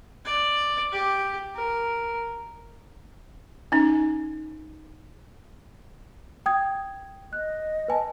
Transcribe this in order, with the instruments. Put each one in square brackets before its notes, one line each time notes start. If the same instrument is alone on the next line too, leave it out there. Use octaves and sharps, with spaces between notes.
[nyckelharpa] D5
G4
A#4
[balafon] C#4 D#4
[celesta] G5 D#6 G#6
[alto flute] D#5 [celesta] F#6
[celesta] B4 G#5 A5